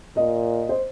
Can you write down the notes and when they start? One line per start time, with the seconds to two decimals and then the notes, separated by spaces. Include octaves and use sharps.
0.16 A#2 D#5
0.69 C5